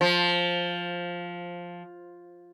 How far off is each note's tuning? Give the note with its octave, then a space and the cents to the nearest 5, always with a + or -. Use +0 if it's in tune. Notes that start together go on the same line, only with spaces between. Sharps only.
F3 +5